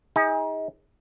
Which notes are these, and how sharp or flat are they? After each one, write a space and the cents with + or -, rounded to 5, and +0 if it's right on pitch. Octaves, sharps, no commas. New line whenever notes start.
D#4 +35 G#4 -20